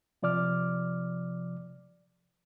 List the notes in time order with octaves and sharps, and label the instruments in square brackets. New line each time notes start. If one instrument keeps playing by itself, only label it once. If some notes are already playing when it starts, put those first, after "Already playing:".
[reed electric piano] C3 F3 D5 D6 F6